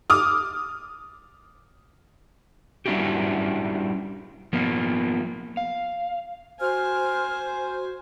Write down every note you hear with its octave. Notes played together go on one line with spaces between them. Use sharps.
D6 D#6 F6
G3 C#4 D4 E4 F#4 G4
F3 A#3 B3
F5
F#4 C5 G#5 F6